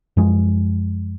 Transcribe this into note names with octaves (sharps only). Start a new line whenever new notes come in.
F#2 F3 G#3